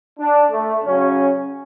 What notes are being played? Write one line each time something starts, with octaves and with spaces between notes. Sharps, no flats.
D4
A3
C#3 F#3 C#4